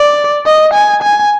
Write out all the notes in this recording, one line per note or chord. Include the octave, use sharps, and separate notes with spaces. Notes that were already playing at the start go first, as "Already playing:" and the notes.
Already playing: D5
D#5
G#5
G#5